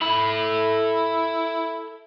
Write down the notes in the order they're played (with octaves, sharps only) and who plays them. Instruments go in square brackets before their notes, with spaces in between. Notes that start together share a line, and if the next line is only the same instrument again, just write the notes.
[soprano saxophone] E4 [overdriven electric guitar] A4 B5